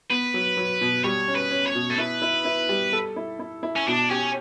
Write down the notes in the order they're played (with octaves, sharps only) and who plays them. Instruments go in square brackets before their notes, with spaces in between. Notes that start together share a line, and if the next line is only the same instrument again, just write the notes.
[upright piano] B3 [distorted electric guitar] B4
[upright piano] F#3
F#3
B2
[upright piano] G3 [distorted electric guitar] C#5
[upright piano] C#4
[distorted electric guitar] B4
[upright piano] C#4
[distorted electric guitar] C#5
[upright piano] B2
[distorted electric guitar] A4
[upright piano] E4 [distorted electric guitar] B4
[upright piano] E4
E4
G3
A4
E4
E4
E4
[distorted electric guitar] C#4
[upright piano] B2 [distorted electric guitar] D4
[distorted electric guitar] C#4 [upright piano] G4